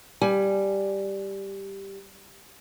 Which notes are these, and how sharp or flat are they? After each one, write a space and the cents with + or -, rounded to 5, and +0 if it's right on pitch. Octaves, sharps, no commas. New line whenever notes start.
G3 +0 G#5 +15